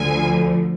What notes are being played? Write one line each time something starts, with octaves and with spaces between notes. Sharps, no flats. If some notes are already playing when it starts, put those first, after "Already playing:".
Already playing: D2 D3 F3 G#5